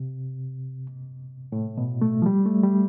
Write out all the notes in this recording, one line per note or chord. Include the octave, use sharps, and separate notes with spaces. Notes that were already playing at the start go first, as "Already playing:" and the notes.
Already playing: C3
A2
B2
A3
F3
G3
A3
G3